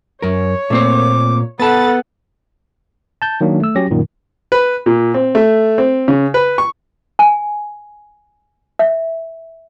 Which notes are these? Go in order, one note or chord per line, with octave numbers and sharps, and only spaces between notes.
F#2 A#4 C#5
A#2 A3 C4 C5 D6
B3 A4 F#5 A5 B5 A6
A5 G6
D#3 F#3 A#3 D4
A3 E6
F#3 C#4 G4 A#6
F#2 A#2 D#3
B4
A#2
C4
A3
C4
C#3
B4
C#6
G#5
E5